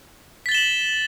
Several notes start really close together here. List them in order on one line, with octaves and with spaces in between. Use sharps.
B6 A6 G7 E7 F#7